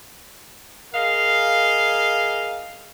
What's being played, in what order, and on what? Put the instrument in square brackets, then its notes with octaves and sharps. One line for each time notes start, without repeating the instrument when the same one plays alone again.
[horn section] G#4 A#4 D#5 F5